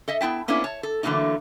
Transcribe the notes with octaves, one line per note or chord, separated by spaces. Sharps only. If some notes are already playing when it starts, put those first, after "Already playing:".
A4 D#5 E5
B3 E4 G5 A5
A#3 B3 C#4 D4 E4 A4
C#5 A5
A4
D3 E3 F#3 A3 A#3 D#4